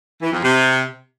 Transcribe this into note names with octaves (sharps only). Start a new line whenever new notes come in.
E3
F2
C3